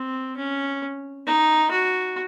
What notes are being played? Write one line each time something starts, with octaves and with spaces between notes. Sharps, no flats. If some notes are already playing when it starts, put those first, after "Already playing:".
Already playing: C4
C#4
D#4
F#4